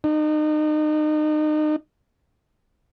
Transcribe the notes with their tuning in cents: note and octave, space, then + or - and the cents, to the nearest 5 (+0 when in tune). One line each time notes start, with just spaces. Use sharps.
D#4 -30